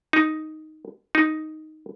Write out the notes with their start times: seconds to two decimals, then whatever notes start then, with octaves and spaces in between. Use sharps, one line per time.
0.13 D#4
1.15 D#4